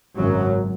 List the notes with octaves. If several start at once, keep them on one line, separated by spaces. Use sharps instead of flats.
G#1 F#2 C#3 F#3